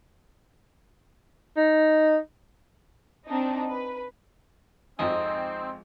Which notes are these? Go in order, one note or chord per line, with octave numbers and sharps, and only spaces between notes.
D#4
C4 D4 D#4
B4
G#1 F2 F3 G#3 C4 D#4 G#5